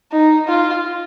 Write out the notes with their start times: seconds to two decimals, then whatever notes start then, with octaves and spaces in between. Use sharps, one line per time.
0.12 D#4
0.48 F4